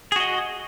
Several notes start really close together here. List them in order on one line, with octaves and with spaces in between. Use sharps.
G#4 F#4 D#5